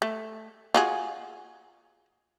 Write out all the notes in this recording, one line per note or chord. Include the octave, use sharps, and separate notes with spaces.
A3
F4 F#4 G#4